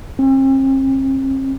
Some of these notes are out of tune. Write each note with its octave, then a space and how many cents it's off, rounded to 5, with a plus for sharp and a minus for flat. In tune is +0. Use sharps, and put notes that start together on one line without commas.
C4 +45